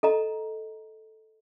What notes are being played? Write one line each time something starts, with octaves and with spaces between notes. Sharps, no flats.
A4 D#5 A#5